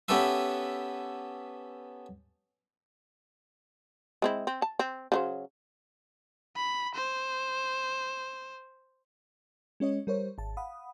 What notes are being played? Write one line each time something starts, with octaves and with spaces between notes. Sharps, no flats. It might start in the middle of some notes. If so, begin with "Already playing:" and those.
B3 C#4 G4 A4 B4 E5
G#3 C4 E4
C4
A5
C4
C#3 F#3 C5
B5
C5
G#3 C#4 C#5 D#5
G3 A#4 C5 C#5
G#1 A5
F5 F#5 B5 D#6